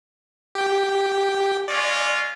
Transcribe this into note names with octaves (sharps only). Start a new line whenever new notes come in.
G4 G5
G#3 C#4 F4 D5